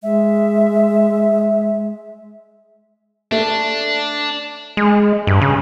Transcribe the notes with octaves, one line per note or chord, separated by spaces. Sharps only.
G#3 E5
A3 D4
G#3
G2
C#3